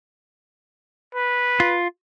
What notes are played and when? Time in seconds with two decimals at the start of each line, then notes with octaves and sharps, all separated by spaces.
1.15 B4
1.60 F4